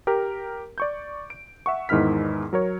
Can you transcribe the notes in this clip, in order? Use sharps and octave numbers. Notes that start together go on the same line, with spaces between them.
G4 A#4
D5 C#6 G6
D7
E5 F#5 C#6
E2 G#2 D#3 E4 F6 B6
F#3 A#4 C#5